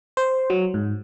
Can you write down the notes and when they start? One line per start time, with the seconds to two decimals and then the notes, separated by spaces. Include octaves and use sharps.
0.17 C5
0.50 F#3
0.74 G#2